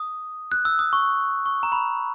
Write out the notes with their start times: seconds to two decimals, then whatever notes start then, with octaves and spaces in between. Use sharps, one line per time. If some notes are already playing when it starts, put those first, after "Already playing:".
Already playing: D#6
0.52 F#6
0.65 E6
0.79 D#6
0.93 C#6
1.46 C#6
1.63 A#5
1.72 B5